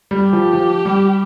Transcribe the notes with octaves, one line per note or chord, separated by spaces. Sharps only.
G3
G4
F3
F3
G3